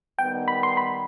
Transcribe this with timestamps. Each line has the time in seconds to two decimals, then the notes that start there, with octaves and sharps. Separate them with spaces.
0.19 D#3 G3 B3 G5
0.48 B5
0.63 C6
0.77 B5